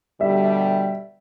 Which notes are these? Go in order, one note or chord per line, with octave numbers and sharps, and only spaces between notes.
B2 D3 G3 E5